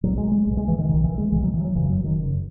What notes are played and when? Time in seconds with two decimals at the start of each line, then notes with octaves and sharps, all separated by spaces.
0.04 B1 B2 F#3
0.17 G#3
0.31 G#3
0.46 B1 B2
0.57 G#3
0.68 E3
0.78 D#3
0.89 B1 B2 D#3
1.04 E3
1.18 G#3
1.32 B1 E3
1.36 B2
1.43 F#3
1.54 E3
1.65 F#3
1.75 F#1 F#2 C#3 E3
1.90 F#3
2.04 D#3
2.18 F#1 F#2 C#3